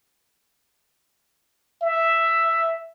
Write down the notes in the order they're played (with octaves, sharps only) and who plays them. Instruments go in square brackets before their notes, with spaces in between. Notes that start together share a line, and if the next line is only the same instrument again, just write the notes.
[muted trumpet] E5